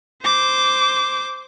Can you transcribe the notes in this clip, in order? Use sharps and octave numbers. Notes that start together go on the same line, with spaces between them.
C5 D6